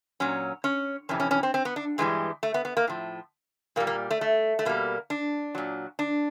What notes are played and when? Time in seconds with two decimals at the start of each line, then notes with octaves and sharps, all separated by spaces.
0.20 A#2 F#3 C#4
0.64 C#4
1.09 F2 C3 E3 C#4
1.20 C#4
1.31 C#4
1.43 C4
1.54 C4
1.65 B3
1.76 D4
1.98 G2 E3 G3 G#3
2.43 A3
2.54 B3
2.65 B3
2.77 A#3
2.87 A2 F3
3.76 A#2 A#3
3.80 G3
3.87 A#3
4.11 A3
4.21 A3
4.59 A3
4.65 B2 G3 A#3
5.10 D4
5.55 A#2 F#3
5.99 D4